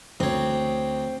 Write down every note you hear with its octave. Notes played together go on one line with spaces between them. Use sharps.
D2 C4 C#5